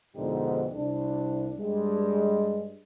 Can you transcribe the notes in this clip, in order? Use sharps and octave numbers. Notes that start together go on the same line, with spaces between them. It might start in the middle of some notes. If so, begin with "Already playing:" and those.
F2 G#2 B2 D3 D#4 G4
C2 D4
G2 G3 G#3